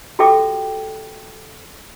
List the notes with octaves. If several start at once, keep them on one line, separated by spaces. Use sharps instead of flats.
F#4 G4 A4 E5 G5 D6